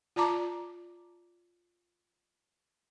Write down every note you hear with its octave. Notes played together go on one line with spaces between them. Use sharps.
F4 D5 A5 A#5 D6